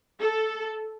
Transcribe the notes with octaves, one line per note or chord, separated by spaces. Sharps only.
A4